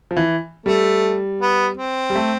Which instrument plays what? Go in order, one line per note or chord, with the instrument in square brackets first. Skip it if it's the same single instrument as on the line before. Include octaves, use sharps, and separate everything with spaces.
[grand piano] F3
E3
[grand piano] G3 [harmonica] A3
[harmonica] B3
C4
[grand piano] G3
A3